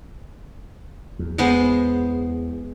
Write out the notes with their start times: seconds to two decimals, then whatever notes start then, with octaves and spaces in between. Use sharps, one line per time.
1.19 E2
1.38 G#3 B3 C5